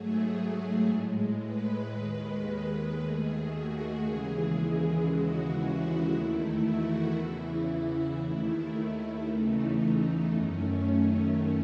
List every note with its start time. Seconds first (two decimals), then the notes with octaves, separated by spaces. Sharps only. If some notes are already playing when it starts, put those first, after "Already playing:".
Already playing: G#2 F#3 A3 G#4
0.88 A2 G#3
1.40 B4
1.92 D#2 D#3 G#3
2.97 D#2 D#3 A3 G#4
3.50 F#4
4.02 D#2 C#3 E3 G#3 G#4
5.06 D#2 C#3 E3 G#3 F#4
5.59 E4
6.11 E2 D#3 A3 E4
6.63 F#4
7.16 E2 C#3 E3 E4
7.69 E4
8.21 D#2 D#3 A3 E4
8.74 E4
9.25 E2 C#3 E3 A3 D#4
10.31 F#2 D#3 A3 C#4